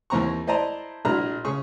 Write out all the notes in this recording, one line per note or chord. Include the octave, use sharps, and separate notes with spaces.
D#2 E3 C4 A#5 C#6
E4 C5 D5 D#5 A5 A#5
A#1 D4 E4 F#4 A#5 F6
C#3 G#4 C#6